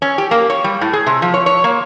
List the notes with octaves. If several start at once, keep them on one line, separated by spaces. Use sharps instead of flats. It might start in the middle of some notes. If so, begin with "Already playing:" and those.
C#4
G4
A#3
C#5
G3
A2
G#4
C3
F3
C#5
C#5
A#3